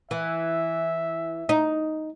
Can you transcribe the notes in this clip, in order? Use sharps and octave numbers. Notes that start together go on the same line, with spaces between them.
E3 E5
D#4